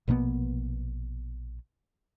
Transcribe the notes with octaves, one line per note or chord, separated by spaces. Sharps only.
A#1 B2 A#3 B3